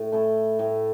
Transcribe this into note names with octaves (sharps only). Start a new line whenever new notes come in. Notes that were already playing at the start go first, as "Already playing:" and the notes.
Already playing: A2
A3 E4 A4
A2